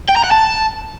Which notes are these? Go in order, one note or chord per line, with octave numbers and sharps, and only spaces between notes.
G5
A#5
F#5
A5